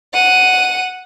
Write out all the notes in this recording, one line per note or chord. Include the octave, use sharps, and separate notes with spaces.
F#5 D#7